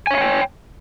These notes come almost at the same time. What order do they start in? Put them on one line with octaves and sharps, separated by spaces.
G#5 C#5 E5 F5 G5